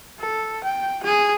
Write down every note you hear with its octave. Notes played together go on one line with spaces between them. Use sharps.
A4
G5
G#4